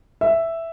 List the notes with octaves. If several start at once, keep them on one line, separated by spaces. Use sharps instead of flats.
E5